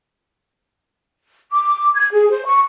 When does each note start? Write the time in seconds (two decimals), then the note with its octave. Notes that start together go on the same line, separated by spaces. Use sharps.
1.52 D6
1.95 G#6
2.13 G#4
2.30 C5
2.46 C#6